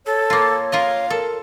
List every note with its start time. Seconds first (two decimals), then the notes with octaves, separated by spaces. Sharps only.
0.06 A4 C#5
0.30 A#3 F4
0.72 F4 A#4 D#5 F5
1.10 A4 A#4